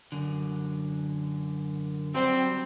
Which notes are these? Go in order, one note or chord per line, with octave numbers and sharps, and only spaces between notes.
F#2 D3
F#3 G3 C4